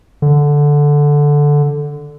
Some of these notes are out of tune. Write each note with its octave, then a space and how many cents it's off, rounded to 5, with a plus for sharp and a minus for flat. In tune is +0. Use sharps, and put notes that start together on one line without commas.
D3 -5